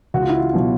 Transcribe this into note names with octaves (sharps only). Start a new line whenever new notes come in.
C#2 F#4
F4
E4
F4
B2 F#3